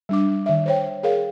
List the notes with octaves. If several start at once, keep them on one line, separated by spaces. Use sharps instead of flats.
G3 D4 D6
D#3 E5
C5 C#5 G5
G#4 A#4 C#5 F5